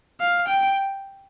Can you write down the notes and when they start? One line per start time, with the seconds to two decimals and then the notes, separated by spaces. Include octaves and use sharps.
0.20 F5
0.48 G5